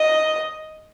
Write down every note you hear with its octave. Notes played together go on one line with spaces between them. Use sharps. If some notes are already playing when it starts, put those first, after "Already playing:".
Already playing: D#5